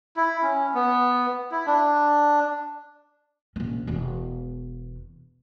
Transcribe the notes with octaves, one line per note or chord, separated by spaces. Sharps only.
E4
C#4
B3
E4
D4
A#1 C#4
E1 E2